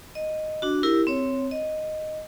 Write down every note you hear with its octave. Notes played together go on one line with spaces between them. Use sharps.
D#5
D4 F#4
E4 G4 A#4
C4 C#5
D#5